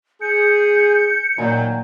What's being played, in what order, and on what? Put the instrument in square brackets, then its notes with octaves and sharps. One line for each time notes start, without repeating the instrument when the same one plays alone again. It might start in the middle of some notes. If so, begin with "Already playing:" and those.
[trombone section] G#4 [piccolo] G6 [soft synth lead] C#7
[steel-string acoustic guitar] A#2 G#5 A#5 [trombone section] D#3 F#3